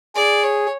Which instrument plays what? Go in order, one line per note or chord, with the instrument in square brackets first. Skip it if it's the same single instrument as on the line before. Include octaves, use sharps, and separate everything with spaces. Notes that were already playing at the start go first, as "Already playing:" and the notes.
[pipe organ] G#4 [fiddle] D5
[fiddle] C#5